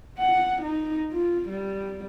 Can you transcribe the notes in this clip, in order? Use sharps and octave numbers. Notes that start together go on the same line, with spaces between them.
F#5
D#4
F4
G3